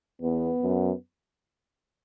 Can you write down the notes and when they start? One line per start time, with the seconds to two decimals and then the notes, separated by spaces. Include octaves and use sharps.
0.22 E2 B3
0.63 F#2